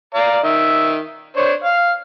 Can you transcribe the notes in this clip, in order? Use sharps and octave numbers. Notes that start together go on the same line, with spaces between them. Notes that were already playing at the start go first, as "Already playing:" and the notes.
D5 F5 A#5
D#3 E5
D4 C5 C#5
F5 F6